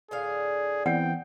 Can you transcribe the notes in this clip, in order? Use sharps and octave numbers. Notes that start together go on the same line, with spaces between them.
A2 D3 G#4 F5
E3 B3 C4 F#5 G5